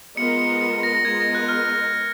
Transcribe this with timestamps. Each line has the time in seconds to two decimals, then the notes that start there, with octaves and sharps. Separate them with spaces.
0.17 G#3 B3 F4 A#4 D#5 C#7
0.39 C#7
0.61 C#7
0.83 A#6
0.95 A#6
1.05 G#3 B3 F4 A#4 D#5 G#6
1.20 A#6
1.35 F#6
1.49 F6